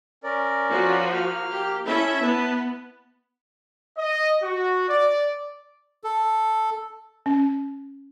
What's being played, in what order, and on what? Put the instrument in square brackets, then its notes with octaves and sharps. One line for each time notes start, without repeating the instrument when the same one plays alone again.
[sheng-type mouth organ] C#4 A#4 D5
[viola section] F3 F#4
[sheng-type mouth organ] A#3 F6
[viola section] G4
[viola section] C#4 E4 E5 [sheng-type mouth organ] A4 B5
[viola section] B3 [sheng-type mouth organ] B4 A5
[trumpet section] D#5
F#4
D5
[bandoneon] A4
[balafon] C#4